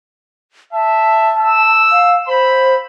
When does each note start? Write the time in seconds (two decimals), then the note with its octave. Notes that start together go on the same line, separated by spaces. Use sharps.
0.73 E5 A5
1.39 E6
1.92 F5
2.28 C5 B5